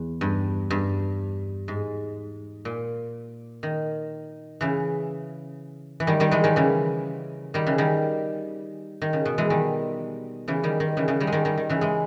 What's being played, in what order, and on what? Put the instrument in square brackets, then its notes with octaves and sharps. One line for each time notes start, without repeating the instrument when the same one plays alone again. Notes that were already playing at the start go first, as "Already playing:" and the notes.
Already playing: [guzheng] E2
G2
G2
G#2
A#2
D#3
C#3 E3
E3
D#3 G3
D#3 G3
E3 G#3
D#3 G3
C#3 E3
D#3 G3
C#3 E3
D#3 G3
D#3
C#3
B2
E3 G#3
D#3 G3
C#3 E3
D#3 G3
D#3
C#3 E3
C#3 E3
D#3 G3
G#3
D#3 G3
D#3 G3
D#3
C#3 E3
E3 G#3